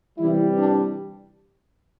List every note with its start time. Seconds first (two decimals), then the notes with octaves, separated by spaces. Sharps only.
0.18 C3 E3 G3 E4
0.58 D4